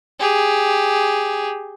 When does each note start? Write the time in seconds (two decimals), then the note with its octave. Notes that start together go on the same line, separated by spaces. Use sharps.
0.20 G4 G#4